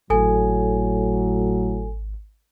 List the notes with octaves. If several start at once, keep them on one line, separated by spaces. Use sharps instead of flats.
G#1 A2 F#3 A4 G#5